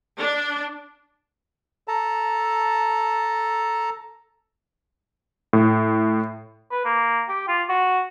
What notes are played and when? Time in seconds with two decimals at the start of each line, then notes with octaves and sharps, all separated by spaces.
0.18 D4
1.88 A4 A5 A#5
5.53 A2
6.71 B4
6.85 A#3
7.29 G4
7.48 F4
7.69 F#4